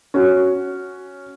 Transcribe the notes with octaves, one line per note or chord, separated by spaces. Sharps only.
C#4 F#4